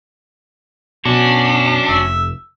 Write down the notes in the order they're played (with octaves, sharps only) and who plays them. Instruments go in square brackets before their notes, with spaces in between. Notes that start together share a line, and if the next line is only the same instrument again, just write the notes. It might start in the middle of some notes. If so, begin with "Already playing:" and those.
[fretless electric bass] B2 [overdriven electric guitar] C#4 F#4 [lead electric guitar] D4
[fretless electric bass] F1 [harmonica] E5